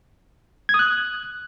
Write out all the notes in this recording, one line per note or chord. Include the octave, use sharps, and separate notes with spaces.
G#6
D#6
F#6